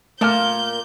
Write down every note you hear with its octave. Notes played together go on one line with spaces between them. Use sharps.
A#2 A3 A#3 F5 A5 F6 G6